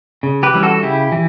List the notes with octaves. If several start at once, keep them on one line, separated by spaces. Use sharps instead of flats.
C#3
G4 B4
E3 G3 C#4
F#4 A4
C#3 E4 G4
E3